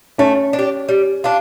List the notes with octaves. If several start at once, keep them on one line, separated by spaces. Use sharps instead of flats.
A3 C#4
D4
G4
G3
D4 F4